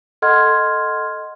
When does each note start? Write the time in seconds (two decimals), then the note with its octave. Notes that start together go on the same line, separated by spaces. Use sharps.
0.22 A4 D#5 F#5 C6 F6 G#6